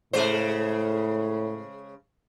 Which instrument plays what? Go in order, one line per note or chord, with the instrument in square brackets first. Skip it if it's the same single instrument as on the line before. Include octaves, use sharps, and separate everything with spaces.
[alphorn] A2 [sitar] C#3 G#3 C5